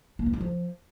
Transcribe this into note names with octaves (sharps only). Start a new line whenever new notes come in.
A#3
E3
G2
F3